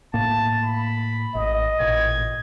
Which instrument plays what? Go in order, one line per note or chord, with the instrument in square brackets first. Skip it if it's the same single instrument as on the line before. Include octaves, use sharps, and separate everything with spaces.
[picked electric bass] A2 A#3 [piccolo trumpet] A5
[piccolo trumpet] B5
[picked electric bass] A1 [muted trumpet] D#5
[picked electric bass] A1 A#2 [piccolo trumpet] G#6